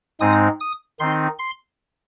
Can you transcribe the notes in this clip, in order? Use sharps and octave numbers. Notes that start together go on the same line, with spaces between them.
G#2 G#3 C4 D#4 D#6
D#6
D#3 C4 D#4 C6
C6